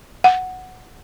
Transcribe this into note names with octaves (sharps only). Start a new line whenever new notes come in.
F#5